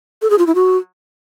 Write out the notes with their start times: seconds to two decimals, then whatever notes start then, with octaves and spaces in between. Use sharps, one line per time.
0.22 A4
0.30 G#4
0.38 F4
0.47 E4
0.55 F#4